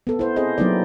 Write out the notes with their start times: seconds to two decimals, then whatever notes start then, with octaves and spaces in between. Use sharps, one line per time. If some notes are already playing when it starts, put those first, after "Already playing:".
0.07 B3 A4
0.19 E4 C5
0.36 C4 G#4 C5 D#5
0.58 F#3 A#3 B3 D#4 E4 D5